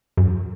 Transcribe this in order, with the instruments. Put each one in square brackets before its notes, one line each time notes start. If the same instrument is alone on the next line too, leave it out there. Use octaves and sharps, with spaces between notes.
[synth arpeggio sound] F#2